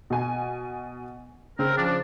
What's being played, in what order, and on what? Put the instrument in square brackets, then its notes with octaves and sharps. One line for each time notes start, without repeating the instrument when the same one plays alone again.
[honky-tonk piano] B2 G#5
[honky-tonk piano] C#3 [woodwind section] C4 A#4
[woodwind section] F3 D4